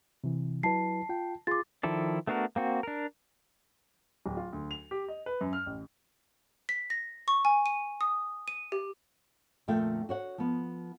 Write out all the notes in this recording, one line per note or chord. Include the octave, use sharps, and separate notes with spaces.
C3 E3
F#3 E4 B4 A5 C7
F4 G5
F4 G#4 C6 D6 A6
D#3 F3 E4 A4 D5
A3 B3 D4 F#4 A#4
A#3 C4 F#4
D4 A#4
D1
F4
D2
F7
G4
D#5
B4
F#2
F6
A1
B6
A#6
C#6
G#5
D#7
D#6
D#7
G4
F2 A#2 D3 A3 F4 G5
F#4 C#5 F#5
F3 B3